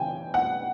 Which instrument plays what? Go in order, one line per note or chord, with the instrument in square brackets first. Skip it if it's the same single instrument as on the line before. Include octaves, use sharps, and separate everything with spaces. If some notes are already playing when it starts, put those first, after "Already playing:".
Already playing: [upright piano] C#3 E3 G5 G#5
F#5